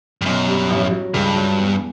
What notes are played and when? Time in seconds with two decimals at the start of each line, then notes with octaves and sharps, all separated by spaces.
0.21 G2
0.26 B1 F#2
0.48 G3
0.70 A1
0.91 F#3
1.14 C#2 G2
1.36 F#3
1.58 E2